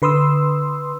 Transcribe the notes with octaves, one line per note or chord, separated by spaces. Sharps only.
D3 B4 C6 D#6 E6